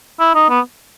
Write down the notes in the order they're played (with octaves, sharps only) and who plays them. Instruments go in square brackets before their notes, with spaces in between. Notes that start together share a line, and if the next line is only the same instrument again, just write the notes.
[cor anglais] E4
D#4
B3